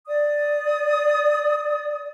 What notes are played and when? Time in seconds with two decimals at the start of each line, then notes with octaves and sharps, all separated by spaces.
0.07 D5 D#6